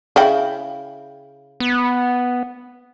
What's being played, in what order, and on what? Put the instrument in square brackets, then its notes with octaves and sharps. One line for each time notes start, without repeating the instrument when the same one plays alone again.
[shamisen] C#3 E4 G5
[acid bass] B3